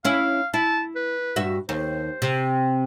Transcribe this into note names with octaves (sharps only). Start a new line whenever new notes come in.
C#4 E4 F5
E4 A5
B4
G2 F#4 E5
D#2 C5
C3